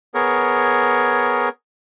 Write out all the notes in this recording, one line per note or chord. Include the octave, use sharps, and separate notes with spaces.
B3 G#4 A#4 C#5